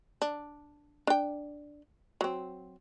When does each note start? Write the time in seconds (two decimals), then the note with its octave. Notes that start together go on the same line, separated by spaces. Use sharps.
0.22 D4
1.07 D4 G5
2.21 F#3 C4